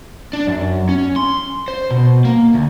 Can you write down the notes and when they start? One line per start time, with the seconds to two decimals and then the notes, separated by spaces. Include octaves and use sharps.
0.33 D4
0.47 F#2
0.89 C#4
1.16 C6
1.68 C5
1.91 B2
2.25 A#3
2.54 D2